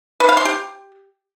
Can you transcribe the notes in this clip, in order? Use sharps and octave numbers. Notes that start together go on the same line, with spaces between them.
B4
F5
C6
G4